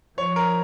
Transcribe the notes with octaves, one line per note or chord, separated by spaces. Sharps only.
F3 C#5
A#4